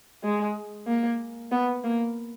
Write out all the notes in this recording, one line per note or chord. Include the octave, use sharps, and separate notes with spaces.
G#3
A#3
B3
A#3